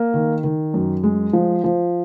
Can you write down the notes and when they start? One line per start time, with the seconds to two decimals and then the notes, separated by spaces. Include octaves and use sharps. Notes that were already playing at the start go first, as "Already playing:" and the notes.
Already playing: A#3
0.14 D#3
0.44 D#3
0.74 F#2
1.03 G#3
1.33 F3
1.64 F3